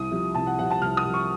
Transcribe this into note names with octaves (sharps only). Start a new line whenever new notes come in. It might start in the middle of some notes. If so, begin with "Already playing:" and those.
Already playing: C2 D#6
C3 F3
C2 A5
F#5
C3 F3 F#5
A5
C2 F6
D#6
C3 F3
C#6